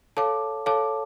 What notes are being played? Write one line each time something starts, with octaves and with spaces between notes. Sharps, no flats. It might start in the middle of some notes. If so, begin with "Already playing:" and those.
A4 C#5 F5 A5 D6
A4 C#5 F5 A5 D6